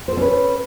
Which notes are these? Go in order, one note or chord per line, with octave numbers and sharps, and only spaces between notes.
C#4 A4 B4 C5